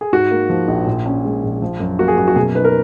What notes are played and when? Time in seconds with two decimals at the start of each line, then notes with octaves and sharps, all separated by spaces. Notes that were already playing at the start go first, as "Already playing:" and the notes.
0.01 G#4
0.12 G#2 F#4
0.31 A#3
0.50 F3
0.68 A#1
0.86 A#2
1.06 C#4
1.24 G#3
1.43 A#1
1.62 F3
1.80 F#2
1.99 A#3 F#4
2.08 G#4
2.17 F#2 F#4
2.28 F#4
2.36 B2 G#4
2.55 D#4 B4
2.65 A#4